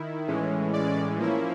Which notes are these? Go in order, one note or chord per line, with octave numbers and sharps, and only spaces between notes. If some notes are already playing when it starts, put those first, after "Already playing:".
Already playing: D#3 E4
A2 E3 G#3 C#4
D5
F3 A#3 C#4 E4